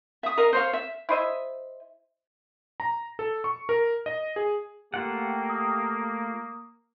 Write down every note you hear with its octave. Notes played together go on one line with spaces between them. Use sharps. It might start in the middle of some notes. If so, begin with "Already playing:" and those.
E5 D#6
A#4 D#5 F5
C5 C#5 F5
E5
E4 C5 D#5 E5
A#5
A4
C#6
A#4
D#5
G#4
A3 A#3 F4 G4 F#5
D#6